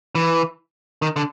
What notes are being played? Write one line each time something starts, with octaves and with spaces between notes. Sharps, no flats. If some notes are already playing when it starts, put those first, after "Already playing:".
E3
D#3
D3